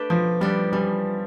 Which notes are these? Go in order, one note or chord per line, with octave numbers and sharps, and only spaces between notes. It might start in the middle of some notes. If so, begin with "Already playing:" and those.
Already playing: A3 D4 G4 B4
B2 F3
G3 B3 D4 G4
E3 G3